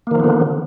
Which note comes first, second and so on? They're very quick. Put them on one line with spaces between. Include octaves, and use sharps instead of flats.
A#3 D#3 F3 B3 D3